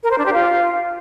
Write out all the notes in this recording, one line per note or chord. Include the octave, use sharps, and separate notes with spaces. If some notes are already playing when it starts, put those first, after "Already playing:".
A#4
C5
D4
G4
F4